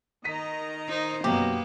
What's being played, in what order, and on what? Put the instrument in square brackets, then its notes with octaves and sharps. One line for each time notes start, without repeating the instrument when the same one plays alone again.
[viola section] D#3 D#5 A#5 [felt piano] B6 D#7
[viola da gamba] D#4 C5
[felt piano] F#2 B2 F#3 [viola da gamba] A#3 B3 [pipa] G4